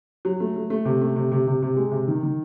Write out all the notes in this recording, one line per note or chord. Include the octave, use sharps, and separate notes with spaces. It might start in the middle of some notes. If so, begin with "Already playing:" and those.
F#3
A3
A3
A3
C3
A3
C3
C3
C3
C3
G#3
C3
D#3
D#3